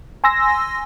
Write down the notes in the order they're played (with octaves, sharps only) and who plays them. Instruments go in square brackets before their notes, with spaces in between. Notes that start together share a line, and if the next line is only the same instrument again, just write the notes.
[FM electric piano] G#5 C6 E6 A#6